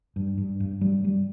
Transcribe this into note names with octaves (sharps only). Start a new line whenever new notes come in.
G2
G2
G2
G3
G3